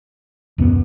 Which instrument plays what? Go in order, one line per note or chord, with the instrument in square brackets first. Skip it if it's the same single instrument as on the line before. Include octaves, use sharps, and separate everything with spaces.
[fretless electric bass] D#1 C#2 B3 [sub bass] F#2